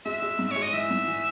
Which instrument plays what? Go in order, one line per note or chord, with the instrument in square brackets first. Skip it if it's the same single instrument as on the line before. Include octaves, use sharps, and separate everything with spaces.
[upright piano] G#3 [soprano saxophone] E5
[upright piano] G#3
G#2
[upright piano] G#3 [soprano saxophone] C#5
[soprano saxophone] D#5
[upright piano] E3 [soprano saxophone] E5
[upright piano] G#2
E3